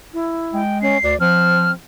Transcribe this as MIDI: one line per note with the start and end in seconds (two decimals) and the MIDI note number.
0.13 0.62 64
0.54 0.96 56
0.54 0.81 79
0.82 0.98 61
0.82 1.15 96
1.03 1.15 38
1.03 1.17 74
1.20 1.72 53
1.20 1.74 60
1.20 1.71 89